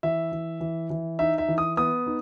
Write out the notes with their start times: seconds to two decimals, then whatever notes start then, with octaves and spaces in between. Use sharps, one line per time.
0.03 E3 E5
0.32 E3
0.61 E3
0.90 E3
1.19 D#4 E5
1.38 E5
1.48 E3
1.58 D#6
1.77 B3 D#6
2.06 D#4